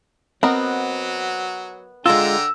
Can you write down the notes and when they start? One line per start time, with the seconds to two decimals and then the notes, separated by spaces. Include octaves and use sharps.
0.43 F#3 B3 C4 A#4 D#5
2.06 D3 G#3 F4 G5 A#5 E6